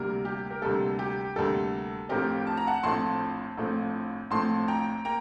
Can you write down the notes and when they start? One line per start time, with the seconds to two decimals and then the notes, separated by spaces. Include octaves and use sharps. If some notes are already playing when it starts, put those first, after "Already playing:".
Already playing: D2 C3 G3 A#3 A#4
0.25 G4
0.51 A#4
0.62 D2 C3 G3 A#3 A4
0.99 G4
1.36 D2 C3 G3 A#3 A4
2.09 A#1 A2 A3 C4 G4 A#4
2.47 A5
2.57 A#5
2.67 F#5 A5
2.83 A#1 A2 A3 C4 A5 C6
3.57 A#1 A2 A3 C4
4.31 A#1 A2 A3 C4 A5 C6
4.68 G5 A#5
5.05 A#3 G5 A#5